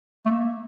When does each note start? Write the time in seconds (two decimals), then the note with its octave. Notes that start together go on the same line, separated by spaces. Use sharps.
0.26 A3
0.30 A#3